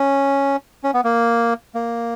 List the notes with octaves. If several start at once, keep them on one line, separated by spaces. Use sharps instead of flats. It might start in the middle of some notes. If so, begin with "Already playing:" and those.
Already playing: C#4
C#4
B3
A#3
A#3